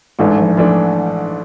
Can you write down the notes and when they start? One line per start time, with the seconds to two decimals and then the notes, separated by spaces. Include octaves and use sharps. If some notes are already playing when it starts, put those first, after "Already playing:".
0.19 A1 G#2 E3 G#3 A3 D4
0.38 F3
0.57 E3 F3 A3 D4